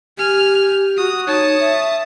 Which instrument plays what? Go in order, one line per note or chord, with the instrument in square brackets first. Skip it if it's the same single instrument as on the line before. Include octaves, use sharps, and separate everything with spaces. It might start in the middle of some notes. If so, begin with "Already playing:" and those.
[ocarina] G4 [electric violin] G#5 F6
[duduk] F#4 [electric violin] D#6
[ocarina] D#4 [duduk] C#5 [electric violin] A5 D#6
[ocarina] E5